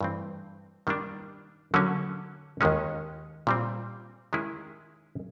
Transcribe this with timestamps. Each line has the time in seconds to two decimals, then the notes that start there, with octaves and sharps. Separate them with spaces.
0.01 G2 E3 A3 C4
0.87 D#3 G3 A#3 D4
1.74 D3 F#3 A#3 C#4
2.61 D#2 D#3 G#3 C#4
3.47 A#2 G3 C4
4.33 D#3 G#3 C#4 E4 G#4